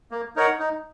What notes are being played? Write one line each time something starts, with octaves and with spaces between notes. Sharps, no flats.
A#3
D#4 A#4 C#5 F#5
D#4